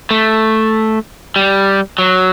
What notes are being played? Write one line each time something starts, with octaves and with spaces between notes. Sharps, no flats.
A3
G3
F#3